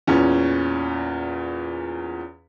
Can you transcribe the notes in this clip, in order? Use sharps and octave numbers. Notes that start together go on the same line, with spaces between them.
E2 A#2 C#4